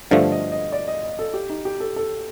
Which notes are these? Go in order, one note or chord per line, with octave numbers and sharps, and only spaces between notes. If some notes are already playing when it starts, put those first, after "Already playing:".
G2 D3 F3 A3 F5
D#5
D#5
D5
D#5
D#5
A4
G4
D#4
G4
A4
A4